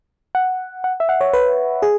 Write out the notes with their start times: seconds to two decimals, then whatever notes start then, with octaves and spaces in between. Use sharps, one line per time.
0.35 F#5
0.84 F#5
1.00 E5
1.09 F#5
1.21 C#5
1.33 B4
1.82 G#4